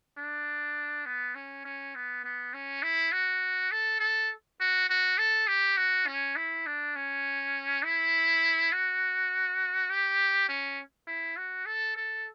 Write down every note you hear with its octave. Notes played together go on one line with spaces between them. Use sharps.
D4
B3
C#4
C#4
B3
B3
C#4
E4
F#4
A4
A4
F#4
F#4
A4
G4
F#4
C#4
E4
D4
C#4
E4
F#4
G4
C#4
E4
F#4
A4
A4